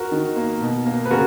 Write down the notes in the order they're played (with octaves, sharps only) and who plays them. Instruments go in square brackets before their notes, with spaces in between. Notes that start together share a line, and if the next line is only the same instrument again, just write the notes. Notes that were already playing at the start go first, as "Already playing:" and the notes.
Already playing: [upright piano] F#4 A#4
D#3
A#3
B2
A#3
B4
C#3 F#4 A#4